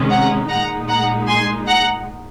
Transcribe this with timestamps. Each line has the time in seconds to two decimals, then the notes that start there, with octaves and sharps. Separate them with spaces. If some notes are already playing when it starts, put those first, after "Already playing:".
Already playing: C3 D#3 G#3 C#4
0.10 F#5 A#5
0.49 A#2 G#3 D#4 F#5 A#5
0.88 F#5 A#5
1.28 G#5 C6
1.67 F#5 A#5